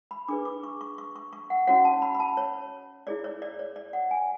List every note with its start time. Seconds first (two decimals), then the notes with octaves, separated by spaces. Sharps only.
0.11 B5
0.28 D4 G#4 B4 D6
0.45 D6
0.63 C#6
0.81 C#6
0.98 C#6
1.16 C#6
1.33 C#6
1.50 F#5
1.67 C#4 F#4 C#5 F#5
1.85 A5
2.02 B5
2.15 B5
2.20 A5
2.37 C#5
3.07 E4 G#4 C#5 D5
3.24 C#5
3.42 D5
3.59 C#5
3.76 D5
3.93 F#5
4.11 G#5